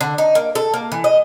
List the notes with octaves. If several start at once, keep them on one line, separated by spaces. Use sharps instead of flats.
D3
D#4
A#3
A4
A#3
E3
D#5